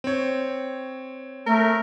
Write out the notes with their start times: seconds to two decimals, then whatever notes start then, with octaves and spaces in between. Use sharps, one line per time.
0.04 C4 C#5
1.46 A3 A#4